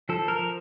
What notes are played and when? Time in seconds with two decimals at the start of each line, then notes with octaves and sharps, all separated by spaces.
0.09 F3 A4
0.28 A#4
0.39 F3